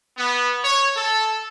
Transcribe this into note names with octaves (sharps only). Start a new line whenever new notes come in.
B3
C#5
A4